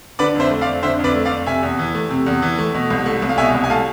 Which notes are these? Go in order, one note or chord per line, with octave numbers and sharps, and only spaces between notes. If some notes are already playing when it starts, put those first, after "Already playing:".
D3 B4 D5
F2
C5 E5
A3
D5 F5
F2
D3 C5 E5
F2
B4 D5
A3
D5 F5
F2
C3 E5 G#5
E2
E3
A3
C3
E2
E3
A3
B2
C2
A3
C2
F5
B2 E5 G#5
C2
G#5
A3 F5 A5